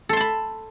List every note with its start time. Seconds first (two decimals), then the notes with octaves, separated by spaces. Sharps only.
0.09 A4
0.13 C6
0.17 A5
0.20 B5